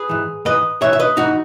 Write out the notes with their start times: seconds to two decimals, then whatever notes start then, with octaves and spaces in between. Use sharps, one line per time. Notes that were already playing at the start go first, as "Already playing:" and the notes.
Already playing: G#4 B4
0.09 G#2 E3
0.45 G#2 E3 B4 D#5
0.81 G#2 E3 C#5 E5
0.93 E5
0.99 B4 D#5
1.17 G#2 E3 D#4 F#4